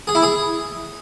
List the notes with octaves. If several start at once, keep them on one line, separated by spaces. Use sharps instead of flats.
G#4
E4
G#4